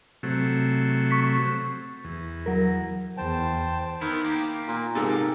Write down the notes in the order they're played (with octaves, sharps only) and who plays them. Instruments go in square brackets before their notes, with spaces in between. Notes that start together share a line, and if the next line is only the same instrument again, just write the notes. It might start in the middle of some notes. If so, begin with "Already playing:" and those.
[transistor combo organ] C3 F#3 A3
[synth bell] C#6 B6
[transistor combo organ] E2
[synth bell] F#3 A#4
[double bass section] E2 [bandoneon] C5 G5 A5
[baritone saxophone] D#3 [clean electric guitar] B3 E4
[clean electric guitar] A#3 G4
[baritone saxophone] A#2 [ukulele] F4
[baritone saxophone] G#2 [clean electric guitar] C3 A4 [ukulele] D#4 G4 A#4